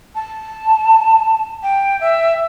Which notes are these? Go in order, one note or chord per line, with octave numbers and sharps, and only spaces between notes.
A5
G5
E5